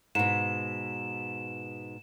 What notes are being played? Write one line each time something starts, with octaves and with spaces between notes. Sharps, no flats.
G#2 B2 E7